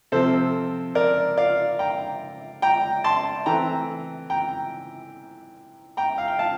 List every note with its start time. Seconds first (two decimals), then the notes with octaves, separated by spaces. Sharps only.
0.12 C3 F3 C4 A4 C5
0.95 A#4 D5
1.37 D5 F5
1.79 G5 A#5
2.62 G5 A#5
3.04 A5 C6
3.46 E3 A3 C4 G5 A#5
4.30 G5 A#5
5.97 G5 A#5
6.18 F5
6.28 G5
6.39 F5 A5